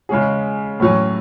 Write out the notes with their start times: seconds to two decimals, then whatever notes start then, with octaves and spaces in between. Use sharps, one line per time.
0.09 C#3 G#3 C#4 G#4
0.80 A2 F#3 C#4